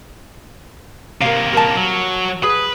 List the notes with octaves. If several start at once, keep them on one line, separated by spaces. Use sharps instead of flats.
C3 A#3 A#4 F5
A#4 A5
F#3
G#4 B4